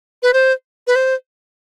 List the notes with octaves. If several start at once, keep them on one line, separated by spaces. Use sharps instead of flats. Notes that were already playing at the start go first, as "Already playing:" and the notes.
B4
C5
B4
C5